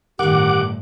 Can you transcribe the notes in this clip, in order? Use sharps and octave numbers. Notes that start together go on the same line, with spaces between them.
G1 A2 D#3 G4 A#4 F#5 D6